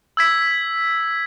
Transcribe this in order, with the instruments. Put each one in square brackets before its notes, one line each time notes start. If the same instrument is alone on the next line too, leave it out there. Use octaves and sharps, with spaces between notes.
[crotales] E6 G#6 B6